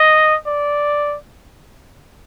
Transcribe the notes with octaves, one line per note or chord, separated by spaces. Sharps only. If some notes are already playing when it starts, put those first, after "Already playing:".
Already playing: D#5
D5